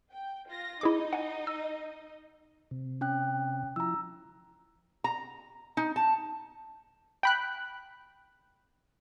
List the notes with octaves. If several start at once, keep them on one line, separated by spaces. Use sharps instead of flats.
G5
F4 A#6
D#4 E4 G#4 D#5 D6
F#5 G#5
E6
C3
C#4 G5 F#6
F3 E4 A#5 E6
A#5
D#4
A5
G5 B5 F#6